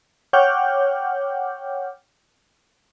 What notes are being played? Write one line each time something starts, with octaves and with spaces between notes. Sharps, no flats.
C#5 F#5 G5 D6 F6 G6